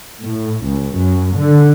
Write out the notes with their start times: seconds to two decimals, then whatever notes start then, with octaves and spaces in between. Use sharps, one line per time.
0.22 A2
0.64 C#2
0.95 F#2
1.36 D3